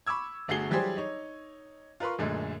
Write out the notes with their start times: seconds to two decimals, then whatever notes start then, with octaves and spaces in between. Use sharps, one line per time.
0.07 B5 C#6 D6 E6 G#6
0.48 G1 A3 F#4 G#4 C7 G7
0.70 E3 F#3 G3 G4 G#4 C5
0.97 D#4 C#5
2.00 F4 A#4 B4 C6 C#6
2.18 F#2 A#2 D3 G#3 A3